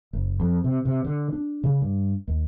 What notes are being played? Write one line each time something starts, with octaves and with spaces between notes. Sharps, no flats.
F#1
F2
C3
C3
D3
D4
C#3
G2
D#2